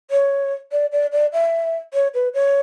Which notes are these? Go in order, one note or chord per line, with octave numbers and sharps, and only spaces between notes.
C#5
D5
D5
D5
E5
C#5
B4
C#5